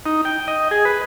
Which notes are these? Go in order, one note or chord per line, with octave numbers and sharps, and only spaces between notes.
D#4
G5
D#5
G#4
B4